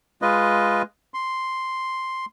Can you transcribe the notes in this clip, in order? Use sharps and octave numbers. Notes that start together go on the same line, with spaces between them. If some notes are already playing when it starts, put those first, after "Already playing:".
G#3 F4 B4 D#5
C6